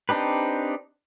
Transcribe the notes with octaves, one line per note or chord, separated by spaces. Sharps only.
C4 D4 D#4 G4 B4